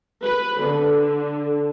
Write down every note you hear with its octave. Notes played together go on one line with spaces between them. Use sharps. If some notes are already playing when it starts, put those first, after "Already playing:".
B4
D3